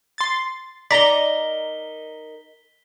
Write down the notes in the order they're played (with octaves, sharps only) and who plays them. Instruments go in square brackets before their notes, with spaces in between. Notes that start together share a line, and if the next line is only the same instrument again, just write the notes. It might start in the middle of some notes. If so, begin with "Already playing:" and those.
[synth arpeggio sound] C6 A6
[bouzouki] D#4 A#4 [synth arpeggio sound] D5 A#5 [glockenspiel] B6 G7